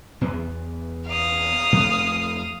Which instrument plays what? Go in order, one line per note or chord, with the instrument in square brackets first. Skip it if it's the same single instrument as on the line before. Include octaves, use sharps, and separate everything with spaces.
[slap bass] E2 B3
[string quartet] F5 D#6
[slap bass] F2 A3